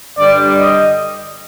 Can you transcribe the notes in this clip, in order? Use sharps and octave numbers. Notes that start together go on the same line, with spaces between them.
G2 D3 G3 D5
D#5